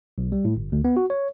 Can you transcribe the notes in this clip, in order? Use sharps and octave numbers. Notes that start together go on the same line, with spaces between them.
B1
G3
A2
G1
D2
B3
F#4
C#5